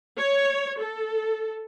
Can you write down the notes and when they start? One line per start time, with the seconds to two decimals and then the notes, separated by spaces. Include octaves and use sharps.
0.17 C#5
0.80 A4